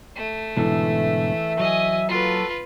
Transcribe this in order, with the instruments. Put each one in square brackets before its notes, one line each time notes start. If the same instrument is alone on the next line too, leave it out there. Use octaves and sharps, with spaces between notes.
[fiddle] A3
[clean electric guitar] G#2 B2 D3 [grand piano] E3 A4 [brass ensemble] E5
[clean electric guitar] F#3 [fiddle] D#5 G#5
[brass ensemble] A#3 F#4 A4 [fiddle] F4 B4